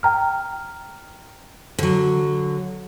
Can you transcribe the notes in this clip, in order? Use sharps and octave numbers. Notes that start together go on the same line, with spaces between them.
G5 A#5 F6
D3 F#3